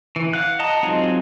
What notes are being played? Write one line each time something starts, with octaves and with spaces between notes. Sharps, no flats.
E3
F5 F#5 F#6
D#5 F#5 A5 A#5 D#6
F#3 G#3 C4 D#4 F4